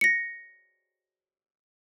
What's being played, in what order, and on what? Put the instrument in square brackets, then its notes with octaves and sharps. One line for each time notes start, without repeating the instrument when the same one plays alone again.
[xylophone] A#6 C#7